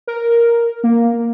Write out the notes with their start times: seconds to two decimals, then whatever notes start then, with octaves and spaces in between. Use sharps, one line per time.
0.07 A#4
0.84 A#3